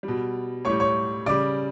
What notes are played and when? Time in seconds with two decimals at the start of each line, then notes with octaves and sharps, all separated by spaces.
0.03 G3
0.08 B2
0.65 A2 G3 C#5 C#6
0.80 C#5 C#6
1.26 C#3 G3 D5 D6